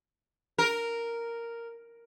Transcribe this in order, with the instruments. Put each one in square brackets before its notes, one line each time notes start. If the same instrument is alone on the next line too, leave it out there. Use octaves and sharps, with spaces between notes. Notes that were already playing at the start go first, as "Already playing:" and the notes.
[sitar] A#4